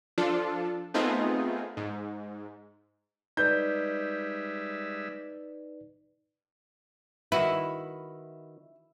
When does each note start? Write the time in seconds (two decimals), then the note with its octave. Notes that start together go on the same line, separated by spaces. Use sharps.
0.18 F3 D4 F4 A4
0.94 A3 B3 C4 D#4 F4 G#4
1.77 G#2
3.37 G3 G#3 D#4 B4 D5 E5 G6
7.32 D#3 E4 F#4 B4